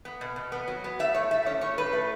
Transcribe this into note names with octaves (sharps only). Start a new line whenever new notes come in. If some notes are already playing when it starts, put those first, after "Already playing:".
B3
B2
B2
B3
F#3
B3
A3 E5
A2 C#5
A3 E5
C#4 C#5
A2 C#5
A2 B4
A3